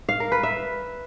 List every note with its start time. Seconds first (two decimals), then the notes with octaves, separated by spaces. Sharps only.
0.09 F5
0.20 A#4
0.32 B4
0.43 E5